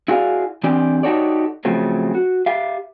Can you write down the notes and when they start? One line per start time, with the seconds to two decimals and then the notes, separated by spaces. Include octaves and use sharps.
0.08 E4 F#4 G#4 A4 D5 F5
0.64 E3 C4 D4 G4 D5
1.03 D#4 F#4 G4 A4 C#5 D5
1.65 C#3 F3 F#3 A3 C4
2.15 F#4
2.46 G4 E5 F5